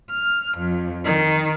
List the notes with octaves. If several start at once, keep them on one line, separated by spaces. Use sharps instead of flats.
F6
F2
D#3